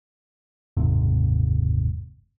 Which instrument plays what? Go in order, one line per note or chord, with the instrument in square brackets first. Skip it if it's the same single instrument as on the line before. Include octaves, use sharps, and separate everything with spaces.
[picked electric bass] F#1 D#2 G#2 C3